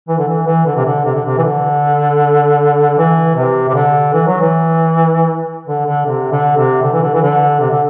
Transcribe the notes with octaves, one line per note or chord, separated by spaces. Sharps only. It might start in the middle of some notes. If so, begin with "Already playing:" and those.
E3
D3
E3
E3
D3
C3
D3
C3
D3
C3
E3
D3
E3
C3
C3
D3
E3
F#3
E3
D3
D3
C3
D3
C3
D3
E3
D3
E3
D3
C3
D3